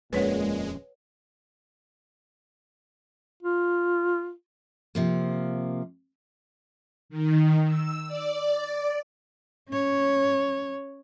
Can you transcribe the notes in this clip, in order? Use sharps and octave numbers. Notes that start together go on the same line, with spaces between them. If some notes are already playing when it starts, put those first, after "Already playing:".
D#1 F2 A#2 G#3 C#4 B4 C#5 F#5
F4
C3 F3 A#3
D#3
E6
D5
C#4 C#5